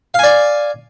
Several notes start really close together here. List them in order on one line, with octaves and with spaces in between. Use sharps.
F5 G#5 D5